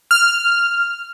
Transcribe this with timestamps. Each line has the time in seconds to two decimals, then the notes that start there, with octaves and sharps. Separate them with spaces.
0.11 F6